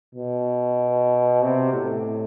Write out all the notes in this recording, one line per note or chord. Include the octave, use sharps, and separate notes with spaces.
B2
C3
A2